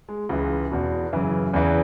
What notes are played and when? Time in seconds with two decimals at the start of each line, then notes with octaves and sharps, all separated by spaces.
0.09 G#3
0.29 C#2 C#3 E3 G#3
0.71 E2 B2
1.13 F#2 C#3 E3
1.54 E2 C#3 E3